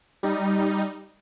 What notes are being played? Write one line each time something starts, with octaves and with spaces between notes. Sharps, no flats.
G3 D#4